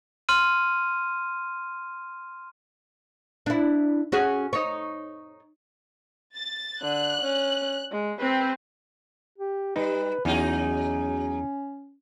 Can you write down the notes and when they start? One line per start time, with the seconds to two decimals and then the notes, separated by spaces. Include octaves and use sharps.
0.29 C6 F6 D#7
3.46 D4 E4
4.12 C#4 F#4 G#4
4.53 D#4 C#5
6.35 A6
6.82 D3 F#6
7.21 C#4
7.91 G#3
8.21 C4 B4
9.38 G4
9.76 G3 D#4 B4
10.25 E2 F#3 C#4 D#4 G#4